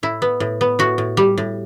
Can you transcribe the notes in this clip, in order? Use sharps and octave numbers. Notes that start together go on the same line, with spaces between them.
A2 E4
B3
A2
B3
A2 F#4
A2
G3
A2